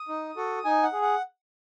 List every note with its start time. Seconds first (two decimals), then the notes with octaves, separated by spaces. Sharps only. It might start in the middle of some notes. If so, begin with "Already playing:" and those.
Already playing: D#6
0.09 D#4
0.36 F#4 A4
0.65 D#4 G#5
0.83 F#5
0.93 G#4
1.02 F#5